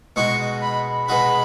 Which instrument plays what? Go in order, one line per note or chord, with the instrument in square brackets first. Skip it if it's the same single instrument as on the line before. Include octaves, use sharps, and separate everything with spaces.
[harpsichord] B2 G#3 D#4 F#4 [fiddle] C#6
[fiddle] B5
[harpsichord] B2 G#3 D#4 F#4 [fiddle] B5